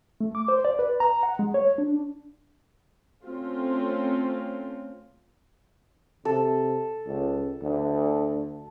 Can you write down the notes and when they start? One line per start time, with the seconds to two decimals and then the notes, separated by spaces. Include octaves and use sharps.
0.21 A3
0.35 D6
0.48 C5
0.65 D5
0.79 B4
1.00 A#5
1.23 F#5
1.39 G#3
1.54 C#5
1.78 D4
3.25 A3 C4 C#4 F4
6.25 C3 A4
7.06 C#2
7.63 D2